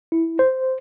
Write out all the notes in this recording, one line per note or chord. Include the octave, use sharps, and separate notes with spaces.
E4
C5